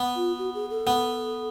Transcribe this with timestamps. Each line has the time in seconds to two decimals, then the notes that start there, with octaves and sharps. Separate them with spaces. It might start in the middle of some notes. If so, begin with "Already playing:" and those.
Already playing: B3
0.16 F4
0.39 F#4
0.55 G#4
0.70 A4
0.87 B3